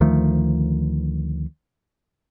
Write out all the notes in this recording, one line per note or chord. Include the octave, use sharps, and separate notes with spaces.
D2 D#3 F3 A3